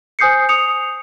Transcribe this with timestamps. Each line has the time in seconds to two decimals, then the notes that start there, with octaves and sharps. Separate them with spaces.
0.19 C5 G#5 D#6 G6 C7 C#7
0.49 D#6 C#7 F7